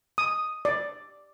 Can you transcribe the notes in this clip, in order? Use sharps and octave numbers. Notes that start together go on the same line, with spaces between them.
D#6
D5